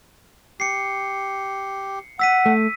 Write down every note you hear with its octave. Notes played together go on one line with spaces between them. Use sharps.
G4 C7 C#7
F#5 E6 B6 D#7
A3